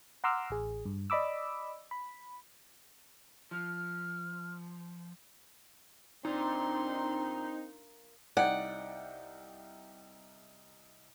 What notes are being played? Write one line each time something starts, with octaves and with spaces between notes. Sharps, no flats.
F#5 A#5 C6 D6 E6 F6
A1 G#4
G2
D5 D#5 B5 D6 E6
B5
F3 F6
A#2 C4 D4 D#4 C6
C2 D#4 D5 F#5 G5